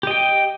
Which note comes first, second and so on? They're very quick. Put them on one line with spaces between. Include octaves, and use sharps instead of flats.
G4 D#5 G5